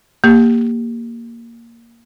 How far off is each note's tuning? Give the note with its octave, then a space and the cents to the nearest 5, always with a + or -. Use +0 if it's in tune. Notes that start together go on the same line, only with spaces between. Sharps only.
A#3 +0 G4 +20